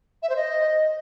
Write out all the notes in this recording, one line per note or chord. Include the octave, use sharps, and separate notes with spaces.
E5
C5
D#5